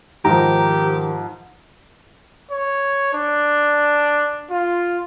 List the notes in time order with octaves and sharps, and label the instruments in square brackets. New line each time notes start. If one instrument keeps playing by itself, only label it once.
[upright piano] G#2 F3 [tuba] D#3 [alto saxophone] G4 [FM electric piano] A#5
[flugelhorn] C#5
D4
F4